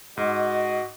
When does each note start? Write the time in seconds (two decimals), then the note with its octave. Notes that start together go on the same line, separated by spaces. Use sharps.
0.17 G#2 F#4 D#5